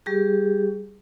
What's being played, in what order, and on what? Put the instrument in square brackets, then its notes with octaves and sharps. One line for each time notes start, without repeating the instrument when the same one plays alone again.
[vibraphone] G3 G4 G#4